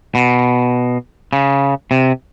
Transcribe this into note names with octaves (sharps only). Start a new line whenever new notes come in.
B2
C#3
C3